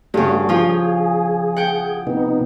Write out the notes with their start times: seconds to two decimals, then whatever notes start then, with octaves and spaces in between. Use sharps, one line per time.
0.14 G2 C#3 G3 A3 F#4
0.49 F3 F4 G#4
1.56 F#5 G5
2.07 C3 B3 D#4